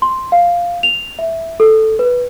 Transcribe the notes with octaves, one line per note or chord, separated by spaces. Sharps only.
C6
F5
F7
E5
A4
B4